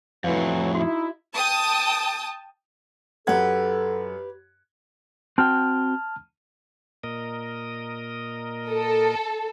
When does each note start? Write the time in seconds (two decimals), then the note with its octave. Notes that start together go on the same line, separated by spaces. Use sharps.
0.24 F2 A2 E3 F#3 F5
0.75 D#4 E4 F#4
1.36 G5 A5 D#6
3.27 F#2 G4 A4 B4 F#5 G#6
5.38 C4 F#4 G5 A5 F6
7.04 A#2 A#4 D#5
8.70 A4